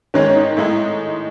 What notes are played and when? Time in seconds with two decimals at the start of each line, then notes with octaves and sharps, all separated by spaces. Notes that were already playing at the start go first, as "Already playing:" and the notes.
0.14 G#2 D#3 G#3 C#4
0.29 C#4
0.35 D#4
0.57 A2 G#3 D#4 E4